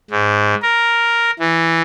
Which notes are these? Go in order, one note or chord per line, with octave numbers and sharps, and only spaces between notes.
G#2
A#4
E3